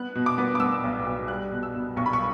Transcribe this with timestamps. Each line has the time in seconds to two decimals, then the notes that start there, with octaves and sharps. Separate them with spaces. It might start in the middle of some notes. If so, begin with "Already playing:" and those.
Already playing: B3 F#6
0.15 B2
0.26 D6
0.38 B3
0.55 D6
0.60 B3 E6
0.84 B1
1.06 B1
1.28 G3 F#6
1.52 B2
1.63 E6
1.74 B2
1.96 B1 C#6
2.06 B5
2.13 C#6